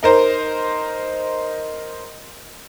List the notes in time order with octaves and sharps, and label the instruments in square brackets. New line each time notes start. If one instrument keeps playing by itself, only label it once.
[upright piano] D#4 A#4 C5